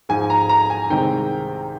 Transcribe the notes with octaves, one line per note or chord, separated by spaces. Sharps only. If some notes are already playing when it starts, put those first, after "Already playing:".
G#2 F3 G#3 G#5
A#5
A#5
G#5
C2 C3 D#3 G#3 G5